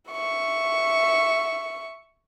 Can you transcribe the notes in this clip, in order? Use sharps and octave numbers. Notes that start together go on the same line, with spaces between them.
E5 C#6